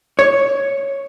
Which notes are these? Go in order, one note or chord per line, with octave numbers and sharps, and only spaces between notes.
C#5